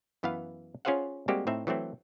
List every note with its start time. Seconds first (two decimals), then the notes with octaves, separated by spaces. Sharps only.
0.23 F#2 E3 B3 B4 F5
0.85 C#4 F4 G#4 C5 F5 F#5
1.28 G3 G#3 A#3 C4 F#4 G4
1.47 A2 C4 D#4 E5
1.67 E3 F#3 A3 C4 E4